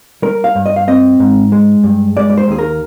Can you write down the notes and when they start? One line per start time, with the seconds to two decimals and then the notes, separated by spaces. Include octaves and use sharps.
0.22 G3 A#4
0.44 F5
0.55 G2
0.66 D#5
0.76 F5
0.88 C4 D#5
1.20 G#2
1.52 G#3
1.83 G2
2.16 G#3 D5
2.30 D5
2.38 C5
2.48 D#2 G#4
2.59 A#4